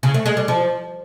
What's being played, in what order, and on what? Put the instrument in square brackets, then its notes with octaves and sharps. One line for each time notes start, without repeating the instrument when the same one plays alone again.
[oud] C#3
A3
G#3
G3
F3